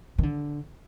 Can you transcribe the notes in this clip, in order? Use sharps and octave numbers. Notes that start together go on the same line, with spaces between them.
D#3
D3